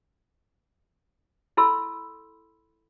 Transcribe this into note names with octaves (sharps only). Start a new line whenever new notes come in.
E4 A4 B5 C6 E6